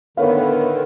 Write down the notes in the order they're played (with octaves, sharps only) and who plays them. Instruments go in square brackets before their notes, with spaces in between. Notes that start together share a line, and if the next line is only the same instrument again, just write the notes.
[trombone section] A2 B3 B4 [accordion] D3 D#3 [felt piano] A#4 C#5 F5